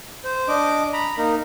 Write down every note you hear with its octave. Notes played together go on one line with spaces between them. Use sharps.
C5
D4 D#5 D6
A#5 B5
A#3 D#4 A#4